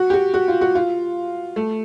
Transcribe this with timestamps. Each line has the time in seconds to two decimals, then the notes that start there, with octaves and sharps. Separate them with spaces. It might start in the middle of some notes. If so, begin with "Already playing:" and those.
Already playing: F#4
0.10 G4
0.13 F#4
0.34 F#4
0.48 F4
0.61 F#4
0.75 F4
1.56 A3